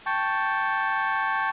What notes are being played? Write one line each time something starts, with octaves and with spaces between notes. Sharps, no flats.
G5 A5 C#6